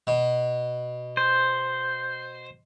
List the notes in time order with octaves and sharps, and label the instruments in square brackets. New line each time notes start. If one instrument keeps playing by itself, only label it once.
[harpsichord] B2
[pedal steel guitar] C5